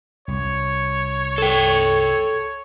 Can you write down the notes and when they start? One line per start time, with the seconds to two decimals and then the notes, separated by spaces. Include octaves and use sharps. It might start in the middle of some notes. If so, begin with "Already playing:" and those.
0.28 C2 C#5
1.38 A4 G5